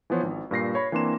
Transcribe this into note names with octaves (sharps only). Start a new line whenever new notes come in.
E3 F3 B3 C5 C#5
G#1
G2 A#2 A#6 C7
C#5 B5
E3 A#3 C4 D4 C6 E7